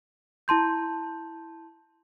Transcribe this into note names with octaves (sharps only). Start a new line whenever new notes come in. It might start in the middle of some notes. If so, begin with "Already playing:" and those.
E4 A5 C6 G6